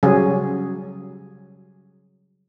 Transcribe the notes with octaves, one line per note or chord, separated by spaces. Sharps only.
C#3 F#3 G3 C#4 G#4